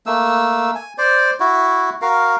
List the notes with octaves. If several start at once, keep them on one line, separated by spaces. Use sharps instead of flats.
A3 A#3 E6
G#5
C5 D5
E4 F#4
F#4 A#4 F5